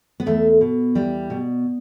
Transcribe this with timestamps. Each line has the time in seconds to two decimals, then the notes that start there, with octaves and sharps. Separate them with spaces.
0.20 B3
0.26 E2 A3
0.61 B2
0.95 E2 G3
1.30 B2